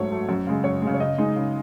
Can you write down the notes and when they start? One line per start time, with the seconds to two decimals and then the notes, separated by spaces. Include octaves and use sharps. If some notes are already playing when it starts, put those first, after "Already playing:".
Already playing: G#2 F#3 A3 C#5
0.10 F#3 A3
0.29 F#2
0.47 C#3 G#3
0.64 F#2 C#5
0.82 C#3 G#3
0.94 C#5
1.00 C#3 D#5
1.18 G#3 D#4
1.36 C#3